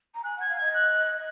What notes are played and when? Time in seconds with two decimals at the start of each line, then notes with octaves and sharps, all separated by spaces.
0.14 A#5
0.24 G#5 F#6
0.36 F#5 G#6
0.49 F5
0.57 D#5 G#6
0.74 F#6